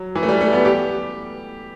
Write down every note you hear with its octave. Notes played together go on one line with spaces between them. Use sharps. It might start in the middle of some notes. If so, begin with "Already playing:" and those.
Already playing: F#3
E3
A3
G3
A3
B3
G4